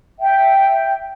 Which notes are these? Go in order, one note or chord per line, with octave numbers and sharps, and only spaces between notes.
E5 G5